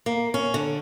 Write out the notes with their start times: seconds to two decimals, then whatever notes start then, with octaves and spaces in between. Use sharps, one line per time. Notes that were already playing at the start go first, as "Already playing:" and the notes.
0.06 A#3
0.34 C#4
0.54 D3